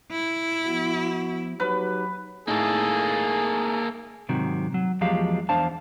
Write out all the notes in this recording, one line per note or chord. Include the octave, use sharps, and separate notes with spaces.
E4
F3 B3 F#4
F#3 D#4 G4 B4
A2 A3 A#3 D#4 G#4 A4
G#2 C3 D#3 F#3
F#3
E2 F3 F#3 G#3 G4 F5
E2 D4 C5 F5 A5